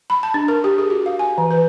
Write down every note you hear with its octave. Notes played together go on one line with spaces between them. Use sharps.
B5
A5
D4
A#4
G4
G#4
F#4
F5
G#5
E3
B4